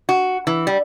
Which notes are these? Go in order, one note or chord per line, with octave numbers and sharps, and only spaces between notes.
F#4
E3
G3